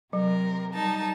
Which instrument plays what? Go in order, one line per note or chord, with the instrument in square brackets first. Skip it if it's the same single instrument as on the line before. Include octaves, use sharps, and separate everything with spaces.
[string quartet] C3 A#4 [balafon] F#3
[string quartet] G3 D#4 A5